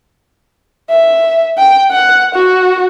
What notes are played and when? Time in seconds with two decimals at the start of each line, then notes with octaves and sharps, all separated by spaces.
0.90 E5
1.58 G5
1.92 F#5
2.35 F#4